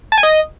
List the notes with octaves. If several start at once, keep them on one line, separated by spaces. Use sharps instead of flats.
A5
G#5
D#5